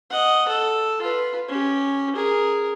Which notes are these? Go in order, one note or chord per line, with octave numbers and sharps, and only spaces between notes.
D#5 F#5
A4
F4 B4
C#4 G4
G#4 A#4